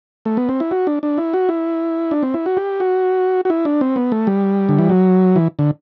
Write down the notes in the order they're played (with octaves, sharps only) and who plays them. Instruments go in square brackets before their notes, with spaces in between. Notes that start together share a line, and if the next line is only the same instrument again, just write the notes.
[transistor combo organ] A3
B3
C4
E4
F#4
D4
D4
E4
F#4
E4
D4
C4
E4
F#4
G4
F#4
F#4
E4
D4
C4
B3
A3
G3
D3
E3
F#3
E3
D3